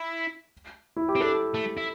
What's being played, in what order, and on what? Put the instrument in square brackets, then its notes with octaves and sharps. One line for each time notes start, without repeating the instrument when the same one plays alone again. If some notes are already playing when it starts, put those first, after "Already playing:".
Already playing: [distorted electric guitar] E4
[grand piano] E4
G4
[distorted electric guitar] C4
[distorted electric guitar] D4 [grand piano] A4
[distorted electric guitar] A3
E4